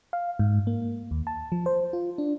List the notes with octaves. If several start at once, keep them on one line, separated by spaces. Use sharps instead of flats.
F5
G#2
A#3
D#2
A5
F3
C5
F4
D4